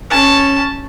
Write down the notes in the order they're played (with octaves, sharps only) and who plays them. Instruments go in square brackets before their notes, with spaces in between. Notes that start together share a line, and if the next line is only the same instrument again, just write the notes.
[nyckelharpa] C#4 A5